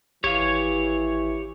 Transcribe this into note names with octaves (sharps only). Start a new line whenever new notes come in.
G#1 E3 G4 C#5 F5